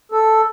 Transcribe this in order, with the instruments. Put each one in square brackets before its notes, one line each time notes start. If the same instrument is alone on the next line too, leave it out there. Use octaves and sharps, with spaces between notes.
[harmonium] A4